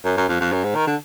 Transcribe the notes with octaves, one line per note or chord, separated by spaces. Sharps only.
F#2
F#2
F2
F2
F#2
G#2
D#3
D3